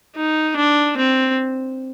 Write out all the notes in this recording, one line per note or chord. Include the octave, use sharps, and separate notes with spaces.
D#4
D4
C4